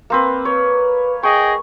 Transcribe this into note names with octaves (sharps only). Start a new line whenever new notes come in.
A#3 C4 B4
B4 C#5
G#4 D#5 G5 C#6